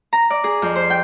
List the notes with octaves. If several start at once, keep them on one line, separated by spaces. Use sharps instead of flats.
A#5
D5
G#4
F2
C5
G5